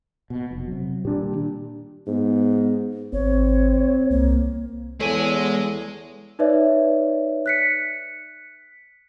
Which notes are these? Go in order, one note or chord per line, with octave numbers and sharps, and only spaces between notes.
B2
F1
C3 F#3
A#2 D#3 G3 D4 G4
G#2 B3
G#1 C4 C#5
C2 A#3
E2 G#3 A4 C#5 G#5
D#4 B4 C#5 D5 E5
F#6 B6 C#7